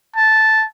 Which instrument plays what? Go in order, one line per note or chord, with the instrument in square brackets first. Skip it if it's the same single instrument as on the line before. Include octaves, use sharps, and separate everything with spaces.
[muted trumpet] A5